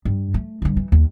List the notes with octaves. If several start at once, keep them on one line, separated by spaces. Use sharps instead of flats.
G2
A3
G2 D3
E3
D#2